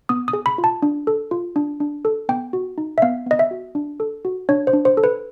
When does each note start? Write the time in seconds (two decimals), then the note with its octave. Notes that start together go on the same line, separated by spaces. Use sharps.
0.09 B3 D#6
0.28 D#6
0.33 G#4
0.46 B5
0.58 F4
0.64 A5
0.82 D4
1.07 A4
1.31 F4
1.56 D4
1.80 D4
2.05 A4
2.29 B3 G5
2.53 F#4
2.78 D#4
2.98 E5
3.02 B3 F5
3.26 B3 D#5
3.39 E5
3.51 F#4
3.75 D4
4.00 A4
4.25 F#4
4.49 D4 C#5
4.67 C5
4.73 D4
4.85 C5
4.97 A4
5.04 B4